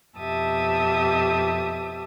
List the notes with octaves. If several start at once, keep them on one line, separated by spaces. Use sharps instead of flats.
F2 B2 G4 E5 A5 D#6